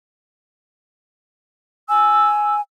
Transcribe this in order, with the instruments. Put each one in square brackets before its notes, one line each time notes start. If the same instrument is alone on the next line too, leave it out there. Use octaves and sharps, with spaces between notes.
[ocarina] G#5 [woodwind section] E6